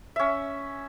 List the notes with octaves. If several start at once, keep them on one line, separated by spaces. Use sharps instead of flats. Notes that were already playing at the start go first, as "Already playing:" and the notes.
C#4 E5